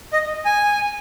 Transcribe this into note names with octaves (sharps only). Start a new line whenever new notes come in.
D#5
G#5